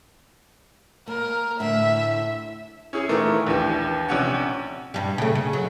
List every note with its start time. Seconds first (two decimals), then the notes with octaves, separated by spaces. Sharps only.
1.07 A#3 A#4
1.60 A2 D3 E5
2.93 C#4 E4 G#4
3.09 A#2 D#3 E3 A3 A#4
3.47 A#1 D#2 E3 G4
4.09 A#1 C3 C#4 F#5
4.94 G2 G3
5.18 C#3 A3
5.35 C#3
5.53 F#3